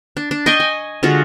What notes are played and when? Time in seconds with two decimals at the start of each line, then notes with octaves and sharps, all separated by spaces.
0.17 D4
0.31 D4
0.46 D#5 G5 C6 C#6
0.60 G#5
1.03 D3 G#3 F4 F#4